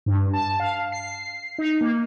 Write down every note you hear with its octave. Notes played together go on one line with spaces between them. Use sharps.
G2
A5
F5
C7
D#4
A#3